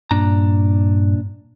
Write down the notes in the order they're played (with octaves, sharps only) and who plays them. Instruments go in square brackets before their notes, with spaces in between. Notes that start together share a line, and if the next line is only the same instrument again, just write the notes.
[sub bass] G2 [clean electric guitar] A#2 D4 A#5